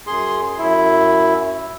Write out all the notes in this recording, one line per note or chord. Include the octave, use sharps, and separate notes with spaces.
F#2 G#4 C6
F#2 E4